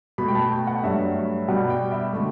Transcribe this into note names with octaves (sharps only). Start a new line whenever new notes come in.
B2 A3 B5
G5
A5
G5
F#5
G2 F#3 A3 E5
B2 G3 F#5
G5
E5
D3 A3